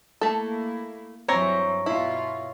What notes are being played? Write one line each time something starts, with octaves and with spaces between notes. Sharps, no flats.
A3 A#3 E4 A4
G2 E3 F#3 C4 C#5 A#5
B2 E4 F4